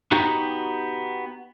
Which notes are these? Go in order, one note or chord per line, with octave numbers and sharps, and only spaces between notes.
B3 D#4 F#4 G4